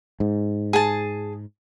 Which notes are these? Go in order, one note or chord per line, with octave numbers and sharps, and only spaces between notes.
G#2
G#4 A5